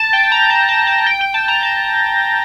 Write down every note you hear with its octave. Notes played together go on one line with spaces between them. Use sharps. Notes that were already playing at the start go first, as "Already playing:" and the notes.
Already playing: A5
G5
A#5
A5
A5
A5
G5
G5
A5
A#5
A5